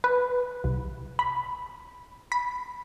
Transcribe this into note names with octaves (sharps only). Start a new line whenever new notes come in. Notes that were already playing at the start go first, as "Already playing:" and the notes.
B4
C2
B5
B5